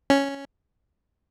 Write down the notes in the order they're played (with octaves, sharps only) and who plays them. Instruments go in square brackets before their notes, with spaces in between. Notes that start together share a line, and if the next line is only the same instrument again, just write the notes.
[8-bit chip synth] C#4